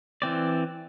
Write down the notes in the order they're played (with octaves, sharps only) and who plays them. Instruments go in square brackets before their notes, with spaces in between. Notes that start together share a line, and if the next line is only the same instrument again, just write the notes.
[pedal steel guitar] E3 C4 D5